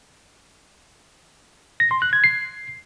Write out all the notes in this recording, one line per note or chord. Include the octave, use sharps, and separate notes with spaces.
A#6
C6
F#6
G#6
C7